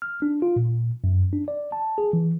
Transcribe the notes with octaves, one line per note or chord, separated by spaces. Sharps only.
F6
D4
F4
A#2
F#2
D4
D5
A5
G#4
E3